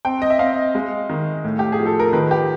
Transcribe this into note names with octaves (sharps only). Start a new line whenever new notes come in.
C4 G5
D#5
E5
C4 F5
G#3
D#3
A2
G4
G#4
F3
A4
A#4
D#3 B4
G4